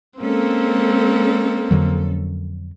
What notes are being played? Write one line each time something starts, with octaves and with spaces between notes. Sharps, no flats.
G#3 A#3 C4 C#4 A4
F2 D3 F#3